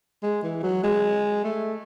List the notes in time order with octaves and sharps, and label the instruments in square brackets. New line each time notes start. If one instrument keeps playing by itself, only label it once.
[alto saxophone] G#3
E3
F#3
G#3
A3